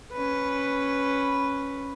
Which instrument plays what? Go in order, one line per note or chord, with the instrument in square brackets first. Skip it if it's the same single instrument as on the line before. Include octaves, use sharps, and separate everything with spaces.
[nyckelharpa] C#4 B4